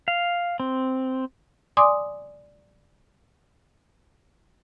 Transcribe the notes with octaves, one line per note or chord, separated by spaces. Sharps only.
F5
C4
D5 G#5 C6 D6 D#6